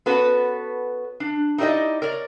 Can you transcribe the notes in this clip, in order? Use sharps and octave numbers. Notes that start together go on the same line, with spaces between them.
B3 C#4 F#4 A4 B4
D4
D#4 E4 G4 C5 D5 D#5
A#4 C#5 D5